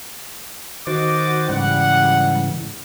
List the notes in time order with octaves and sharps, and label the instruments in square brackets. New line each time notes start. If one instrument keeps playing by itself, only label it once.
[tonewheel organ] D#3 C5 A6 [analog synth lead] F#4 [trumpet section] D#5 D6
[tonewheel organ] G#2 C#3 E3 [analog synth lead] G3 [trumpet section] F#5